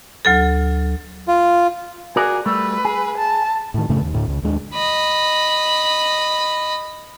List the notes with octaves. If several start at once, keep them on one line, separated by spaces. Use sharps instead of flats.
D2 F#3 A4
F4
F#4 G#4 A#4 D5
G3 A3 B4
G#4
A5
A2 D#3
F#2 A2 C#3 A3
D#2
D2 A2
C#2
D#2 G#3 D4
D#5 B5